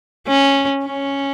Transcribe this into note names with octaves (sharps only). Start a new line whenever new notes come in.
C#4
C#4